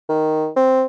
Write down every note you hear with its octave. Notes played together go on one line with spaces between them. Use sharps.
D#3
C4